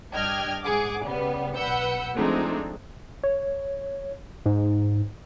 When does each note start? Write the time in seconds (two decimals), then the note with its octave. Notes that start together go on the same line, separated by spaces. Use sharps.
0.12 G2 D4 D#5 G5 F6 G#6
0.63 G#2 G#4 F#5 D6
1.04 C#3 G3 B3
1.55 B1 B4 F#5 E6 G6 C#7
2.15 F3 G#3 A3 C4 D4 D#4
3.24 C#5
4.46 G#2